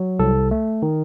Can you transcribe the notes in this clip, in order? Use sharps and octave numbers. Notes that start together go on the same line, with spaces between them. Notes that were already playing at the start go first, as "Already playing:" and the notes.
Already playing: F#3
C2 A4
A3
D#3